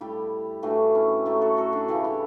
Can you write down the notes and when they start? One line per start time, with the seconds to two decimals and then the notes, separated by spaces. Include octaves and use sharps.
0.01 A2 G3 E4 G4
0.63 A2 E3 A3 D4 F#4
0.95 C#4 E4
1.26 A2 F#3 A3 E4 G4
1.41 F#4 A4
1.57 F#4 A4
1.73 D4 F#4
1.88 C#3 E3 A3 E4 G4
2.04 E4 G4